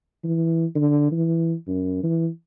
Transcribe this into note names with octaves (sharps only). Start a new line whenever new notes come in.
E3
D3
E3
F#2
E3